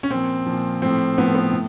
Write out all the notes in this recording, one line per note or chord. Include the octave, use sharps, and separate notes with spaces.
C#4
A#2 F3 C4
A#2 F3
A2 F3 C4
A2 F3 B3
B3
A2